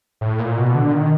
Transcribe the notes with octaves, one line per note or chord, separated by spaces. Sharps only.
A2
A#2
B2
D3
D#3